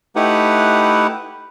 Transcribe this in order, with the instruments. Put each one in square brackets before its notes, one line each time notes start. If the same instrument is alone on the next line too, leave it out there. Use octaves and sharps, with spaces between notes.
[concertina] A3 D#4 E4 G4 B4 F#5